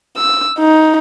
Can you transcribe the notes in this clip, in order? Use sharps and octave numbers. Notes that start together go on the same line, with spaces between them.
E6
D#4